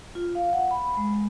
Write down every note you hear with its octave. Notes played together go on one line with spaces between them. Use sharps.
F4
F5
F#5
B5
G#3